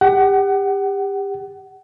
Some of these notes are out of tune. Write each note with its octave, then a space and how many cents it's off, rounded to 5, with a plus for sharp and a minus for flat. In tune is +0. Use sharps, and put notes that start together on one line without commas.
G4 +30 F#5 +30